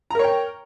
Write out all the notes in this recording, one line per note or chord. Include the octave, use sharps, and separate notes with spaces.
A#4 C#5 G5 A#5